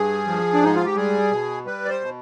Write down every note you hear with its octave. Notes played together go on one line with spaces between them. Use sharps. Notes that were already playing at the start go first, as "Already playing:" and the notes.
Already playing: G2 G#4
F3
D4
G#2 D#4
F4
G4
G3 G#4
B2
G3 B4
D5
C5
B2